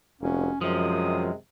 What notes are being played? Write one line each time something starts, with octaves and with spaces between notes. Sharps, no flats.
F1 G#3 A#3 C#4 F#4
F#2 C3 D#3 F3 G#3 D#6